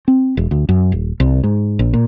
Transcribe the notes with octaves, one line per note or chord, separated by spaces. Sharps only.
C4
E1
D2
F#2
D#1
C2
G#2
A#1
A#2